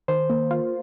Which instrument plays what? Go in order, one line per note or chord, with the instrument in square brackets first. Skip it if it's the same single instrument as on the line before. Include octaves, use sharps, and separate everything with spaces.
[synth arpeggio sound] D#3 [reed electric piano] C5
[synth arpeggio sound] A#3
F4